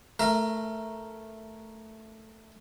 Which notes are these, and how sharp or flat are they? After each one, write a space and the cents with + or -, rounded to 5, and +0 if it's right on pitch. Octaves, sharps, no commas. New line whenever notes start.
A3 +0 A#4 +0 E5 +40